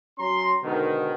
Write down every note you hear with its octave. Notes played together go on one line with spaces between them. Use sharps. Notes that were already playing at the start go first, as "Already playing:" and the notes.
F#3 C#4 A#5 C6
G#2 B2 D3 D#3